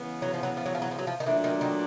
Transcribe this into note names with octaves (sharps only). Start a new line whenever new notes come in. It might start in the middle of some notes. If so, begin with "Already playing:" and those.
Already playing: C#3 E3 G#3 B3
F#3
F3
F#3
F3
F#3
F3
F#3
F3
F#3
F3
D#3
A#2 E3 F#3 A3 D4
D#3
D#3